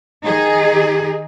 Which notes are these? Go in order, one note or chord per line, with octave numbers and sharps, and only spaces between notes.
D#3 D#4 G#4